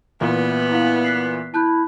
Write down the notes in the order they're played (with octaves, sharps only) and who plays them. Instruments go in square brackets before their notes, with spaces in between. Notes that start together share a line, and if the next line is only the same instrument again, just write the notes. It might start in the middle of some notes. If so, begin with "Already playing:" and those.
[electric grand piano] A#2 E3 [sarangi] B3
[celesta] E4 F5 F#5
F#6 B6 C7
[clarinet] E4 [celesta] A5 F#6 G6